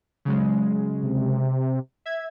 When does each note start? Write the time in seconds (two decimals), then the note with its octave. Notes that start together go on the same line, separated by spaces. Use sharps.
0.25 C#3 F#3 G#3
1.03 C3
2.06 E5 G#6